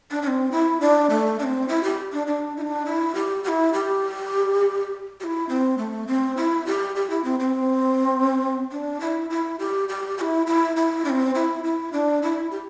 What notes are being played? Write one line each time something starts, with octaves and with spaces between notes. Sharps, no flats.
D4
D4
C4
E4
D4
A3
D4
C4
E4
G4
D4
D4
E4
D4
E4
G4
G4
E4
G4
G4
E4
C4
A3
C4
E4
G4
G4
E4
C4
C4
D4
E4
E4
G4
G4
G4
E4
E4
E4
D4
C4
E4
E4
D4
E4
G4